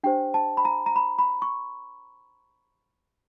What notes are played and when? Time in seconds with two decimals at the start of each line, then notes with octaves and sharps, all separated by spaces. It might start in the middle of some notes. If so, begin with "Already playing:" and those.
0.04 D4 G4 C5 G5
0.34 A5
0.57 B5
0.65 A#5
0.86 A#5
0.96 B5
1.19 B5
1.42 C#6